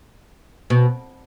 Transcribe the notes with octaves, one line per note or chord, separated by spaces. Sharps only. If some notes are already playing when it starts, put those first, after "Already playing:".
B2